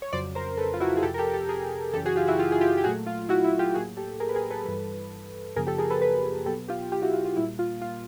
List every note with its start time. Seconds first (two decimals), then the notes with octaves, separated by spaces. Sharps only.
0.02 C#5
0.13 F2 C#3 F#3 C5 D5
0.35 A#4 C5
0.57 A4 B4
0.74 F4
0.80 E4 F#4
0.97 G#4
1.03 F2 C3 F3 G4 A4
1.14 A#4
1.18 G4 A4
1.34 G4 A4
1.49 G#4 A#4
1.93 F#2 C#3 E3 G4 A4
2.06 F#4 G#4
2.16 F4 G4
2.27 E4 F#4
2.38 F4 G4
2.52 G#4
2.61 F4 G4
2.78 G4
2.84 A#2 F#3 A3 F#4 G#4
3.06 F4
3.29 E4 F#4
3.44 E4 F#4
3.59 F4 G4
3.74 A2 F#3 A#3 F#4 G#4
3.97 G4 A4
4.20 G#4 A#4
4.29 B4
4.35 G#4 A#4
4.50 A4 B4
4.65 G2 E3 G3 A4 B4
5.56 F#2 C#3 F3 A#3 G#4 A#4
5.67 G4 A4
5.78 G#4 A#4
5.90 A4 B4
6.01 A4 B4
6.46 B2 F#3 B3 G4 A4
6.68 F4 G4
6.92 F4 G4
7.02 E4 F#4
7.14 F4
7.25 F4
7.37 A#2 G3 A#3 E4
7.59 F4
7.82 F4